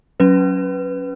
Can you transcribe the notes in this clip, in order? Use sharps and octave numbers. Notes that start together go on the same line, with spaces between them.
F#3 C#4 B4